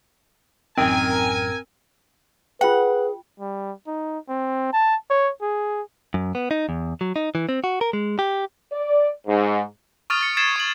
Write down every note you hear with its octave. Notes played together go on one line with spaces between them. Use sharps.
A1 F#2 A2 D#3 C4 A#4 G5 G#5
F4 G#4 B4 F#5 G5
G3
D#4
C4
A5
C#5
G#4
F#2
B3
D#4
E2
F#3
D#4
E3
C4
F#4
A#4
G#3
G4
D5
G#2
C#6 D#6 F6 A6 D#7 F7
A6 C#7
G#6 A6 C7 E7
C#6 F#7